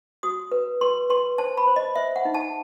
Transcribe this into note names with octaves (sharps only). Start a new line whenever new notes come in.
F#4 D#6
B4
B4 C6
B4 C6
C5 A5
B5
C5
D#5
C5 E5
F#5
D#4
A5